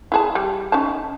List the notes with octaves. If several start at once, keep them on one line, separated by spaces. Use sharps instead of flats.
E4 G#4 A5
G3
C#4 D#4 A5